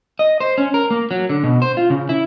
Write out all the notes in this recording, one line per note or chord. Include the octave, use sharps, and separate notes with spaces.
D#5
C5
C#4
A#4
A#3
F#3
D3
B2
C5
F4
C#3
E4